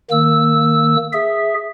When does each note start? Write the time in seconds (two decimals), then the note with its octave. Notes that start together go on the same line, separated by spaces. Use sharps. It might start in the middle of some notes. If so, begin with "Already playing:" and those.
0.11 D#3 A#3 E6
1.13 G#4 E5